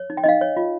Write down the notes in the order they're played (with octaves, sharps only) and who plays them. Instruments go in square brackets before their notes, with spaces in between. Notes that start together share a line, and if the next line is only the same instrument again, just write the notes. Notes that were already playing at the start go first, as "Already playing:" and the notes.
Already playing: [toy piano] C#5
D#4
G5
D#4 D#5 F5
C#5
F4